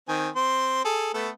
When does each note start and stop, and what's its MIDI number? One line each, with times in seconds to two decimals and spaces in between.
0.08 0.29 51
0.08 0.29 60
0.08 0.29 80
0.36 0.80 60
0.36 0.80 84
0.85 1.10 68
0.85 1.10 69
1.14 1.30 57
1.14 1.30 59
1.14 1.30 69